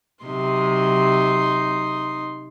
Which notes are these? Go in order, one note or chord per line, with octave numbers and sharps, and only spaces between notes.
C3 F#3 D#4 C6